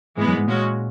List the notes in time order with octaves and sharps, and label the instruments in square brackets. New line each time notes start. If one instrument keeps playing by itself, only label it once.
[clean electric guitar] G#2 [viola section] E3 G#3 B3
[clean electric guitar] F#2
G#2
[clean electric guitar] A#2 [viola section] G#3 C#4 F#4